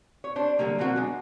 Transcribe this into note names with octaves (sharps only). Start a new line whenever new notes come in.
C#5
D4 C5
D3 F#3 G3 A#3
B2 F#3 A#3 C4 F#4 C5
G#3 D4